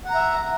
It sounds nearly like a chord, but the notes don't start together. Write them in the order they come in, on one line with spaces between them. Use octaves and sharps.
F#5 A#5 E5